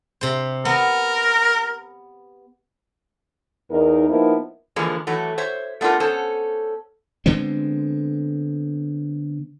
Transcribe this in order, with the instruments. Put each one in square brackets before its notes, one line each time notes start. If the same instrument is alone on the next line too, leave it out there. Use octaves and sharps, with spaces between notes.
[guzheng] C3 C5
[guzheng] B3 [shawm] A#4
[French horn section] E2 D#4 A#4
F3 A#3 B3 D#4 E4 A#4
[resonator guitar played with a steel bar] D3 E3 F3 G#3 A#3
E3 F#3 A3
C5 C#5 E5
A3 B3 D4 F4 A#4
B3 C#4 A4 C5
[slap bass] D3 G#3 B3 C4